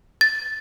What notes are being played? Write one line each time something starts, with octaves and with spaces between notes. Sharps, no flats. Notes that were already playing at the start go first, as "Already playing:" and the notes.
A6